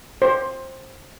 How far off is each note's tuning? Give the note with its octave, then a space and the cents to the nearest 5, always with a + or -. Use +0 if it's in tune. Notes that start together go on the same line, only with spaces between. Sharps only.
C5 +15